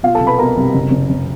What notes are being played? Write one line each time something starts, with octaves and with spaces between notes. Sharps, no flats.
B2 F4 F5
A4 A5
C2
B4 B5
B2 A#4 A#5
C2
F#1
F#1
F#1